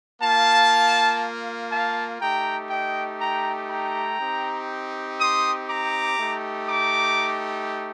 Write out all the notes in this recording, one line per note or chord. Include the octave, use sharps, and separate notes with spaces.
A#3 F4 F5 A5
F5 A5
A3 D#4 G4 G5 A#5
D#5 G5
G5 A#5
G5 A#5
C4 D#4 G4
C6 D#6
A#5 D6
A3 D#4 G4
A#5 D6